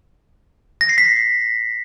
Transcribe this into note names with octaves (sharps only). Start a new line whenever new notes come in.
A#6
C7
B6